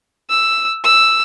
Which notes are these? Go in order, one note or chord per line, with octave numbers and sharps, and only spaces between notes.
E6
E6